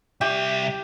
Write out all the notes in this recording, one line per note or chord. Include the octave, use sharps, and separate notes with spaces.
C2 G4 E5